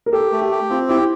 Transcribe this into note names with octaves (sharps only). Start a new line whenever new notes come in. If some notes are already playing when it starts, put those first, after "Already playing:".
A#4
G4 A4
A3
G4
G4
C4 F4
E4 G4